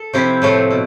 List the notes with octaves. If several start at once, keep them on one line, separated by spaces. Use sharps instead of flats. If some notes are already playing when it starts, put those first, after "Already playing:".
Already playing: A4
C3 F3 C4 E4 G4
A2 F3 A3
B2